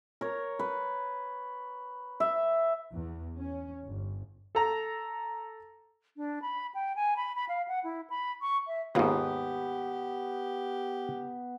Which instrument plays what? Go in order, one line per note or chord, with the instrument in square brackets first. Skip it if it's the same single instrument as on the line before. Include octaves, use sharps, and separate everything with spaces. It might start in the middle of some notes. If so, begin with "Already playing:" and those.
[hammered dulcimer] A#4 C#5
B4
E5
[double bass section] E2
C#4
G1
[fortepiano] A4 A#5
[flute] D4
B5
G5
G#5
B5
B5
F5
F#5
E4
B5
C#6
E5
[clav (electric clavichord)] D#2 G#2 [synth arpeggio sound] A#3 F4 [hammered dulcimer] B3 [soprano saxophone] G4